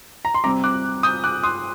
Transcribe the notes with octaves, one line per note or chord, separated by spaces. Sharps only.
A#5
C6
C3 G3 C4 A#5 D6
D6 F#6
D#6 G6
D6 F#6
C6 D#6